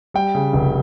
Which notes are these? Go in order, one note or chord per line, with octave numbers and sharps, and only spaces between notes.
G3 G5
C#3
F1